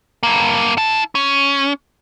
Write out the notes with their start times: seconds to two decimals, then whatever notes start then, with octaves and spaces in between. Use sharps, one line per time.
0.23 G2 A#3
0.77 E4 A5
1.15 C#4